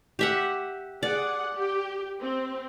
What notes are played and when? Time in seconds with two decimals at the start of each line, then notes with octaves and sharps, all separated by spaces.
0.19 G4 E5 F#5
1.03 G#4 D5 F#5
1.56 G4
2.22 C4